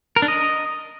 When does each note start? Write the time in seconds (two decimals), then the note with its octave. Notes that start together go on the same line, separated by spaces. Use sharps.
0.16 A#4
0.22 D4
0.28 D#5